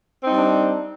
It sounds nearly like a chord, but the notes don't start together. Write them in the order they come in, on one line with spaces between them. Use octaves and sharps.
C4 D#4 G3 D4